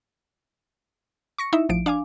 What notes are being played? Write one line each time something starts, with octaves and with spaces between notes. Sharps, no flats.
C#6 A#6 C#7
D#4 E4 E5
A1 F3 D7
D4 F5 G#5 D6